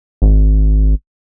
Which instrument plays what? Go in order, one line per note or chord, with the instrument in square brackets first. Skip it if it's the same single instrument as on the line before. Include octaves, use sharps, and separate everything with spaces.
[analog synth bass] G#1